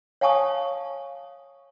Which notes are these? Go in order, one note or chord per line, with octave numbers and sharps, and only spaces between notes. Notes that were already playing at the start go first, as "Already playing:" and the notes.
C#5 F5 G#5 A5 C#6 D#6